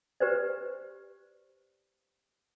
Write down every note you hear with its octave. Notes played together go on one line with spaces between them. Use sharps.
G4 B4 C5 D5